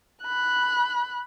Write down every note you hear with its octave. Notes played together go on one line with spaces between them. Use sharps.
B5 F#6